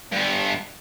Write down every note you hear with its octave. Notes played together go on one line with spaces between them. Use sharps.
G2 B3